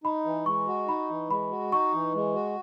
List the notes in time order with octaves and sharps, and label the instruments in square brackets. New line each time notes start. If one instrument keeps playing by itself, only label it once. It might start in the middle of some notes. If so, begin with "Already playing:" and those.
[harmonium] D#4 [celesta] B5
[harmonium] E3
[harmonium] G#3 [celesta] C#6
[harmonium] F#4
[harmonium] D#4 [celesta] B5
[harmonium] E3
[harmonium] G#3 [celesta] B5
[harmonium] F#4
[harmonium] D#4 [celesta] C#6
[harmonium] E3
G#3
F#4